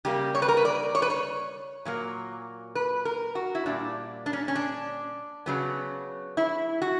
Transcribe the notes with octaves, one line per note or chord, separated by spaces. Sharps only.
C#3 G3 A#3 G4
C#5
B4
A#4
B4
D5
C#5
B4
C#5
A#2 F#3 A#3
B4
A#4
F#4
E4
A#2 G3 A#3 D4
D4
C#4
C#4
D4
C#3 F#3 B3
E4
F#4